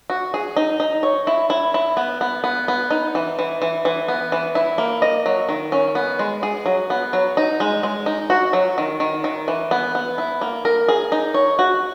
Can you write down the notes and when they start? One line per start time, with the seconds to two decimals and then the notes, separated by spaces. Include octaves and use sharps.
0.10 F#4
0.34 G#4
0.57 D#4
0.80 D#4
1.03 C#5
1.27 E4
1.50 E4
1.74 E4
1.97 B3
2.21 B3
2.44 B3
2.68 B3
2.91 D#4
3.15 E3
3.39 E3
3.62 E3
3.85 E3
4.08 B3
4.32 E3
4.55 E4
4.78 A#3
5.02 D#5
5.26 F#3
5.49 D#3
5.72 C#4
5.95 B3
6.19 G#3
6.43 G#4
6.66 F#3
6.90 B3
7.13 F#3
7.37 D#4
7.60 G#3
7.83 G#3
8.06 D#4
8.30 F#4
8.53 F#3
8.78 D#3
9.00 D#3
9.24 D#3
9.48 E3
9.71 B3
9.95 B3
10.18 E4
10.41 A#3
10.65 A#4
10.88 G#4
11.12 D#4
11.34 C#5
11.59 F#4